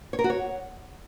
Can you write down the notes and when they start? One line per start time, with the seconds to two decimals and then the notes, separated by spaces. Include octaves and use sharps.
0.13 C#5
0.19 A#4
0.24 F#4
0.30 C#5